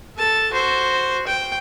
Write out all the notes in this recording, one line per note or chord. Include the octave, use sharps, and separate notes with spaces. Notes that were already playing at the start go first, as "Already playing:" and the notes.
A4 A5
F#4 C5
G5